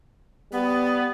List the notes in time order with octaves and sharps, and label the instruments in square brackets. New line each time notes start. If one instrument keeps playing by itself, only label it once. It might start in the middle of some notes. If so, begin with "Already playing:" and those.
[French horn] G3 [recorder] B3